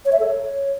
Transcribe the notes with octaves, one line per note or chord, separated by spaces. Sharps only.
C#5
E5
A4
C#5